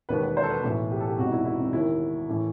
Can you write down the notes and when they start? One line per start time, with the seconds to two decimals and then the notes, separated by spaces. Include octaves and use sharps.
0.09 E1 D#2 D#3 B4
0.23 B4
0.37 C5
0.43 A4
0.50 B4
0.63 B1 A2 E3 B4
0.91 G4
1.00 A4
1.08 G4
1.18 E1 E2 C3 F#4
1.25 D#4
1.32 E4
1.45 E4
1.59 C4
1.73 D#2 D#3 E4
2.29 A2 E3